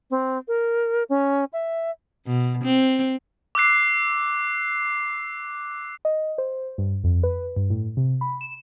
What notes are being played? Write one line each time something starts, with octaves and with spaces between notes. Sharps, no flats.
C4
A#4
C#4
E5
B2
C4
D6 E6 F#6 C7
D#5
C5
G2
F2
B4
G2
A2
C3
B5
E7